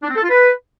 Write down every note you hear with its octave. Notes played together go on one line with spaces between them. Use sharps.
D4
C4
A4
F4
B4